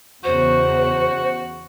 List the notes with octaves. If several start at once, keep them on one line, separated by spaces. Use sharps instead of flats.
E2 C#3 F#4 C5